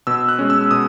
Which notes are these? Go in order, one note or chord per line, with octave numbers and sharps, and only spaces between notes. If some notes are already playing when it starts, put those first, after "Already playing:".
B2 E6
F#6
G#3 C#4
E6
B2 D#6